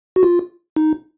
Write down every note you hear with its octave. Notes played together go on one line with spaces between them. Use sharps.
F#4
F4
D#4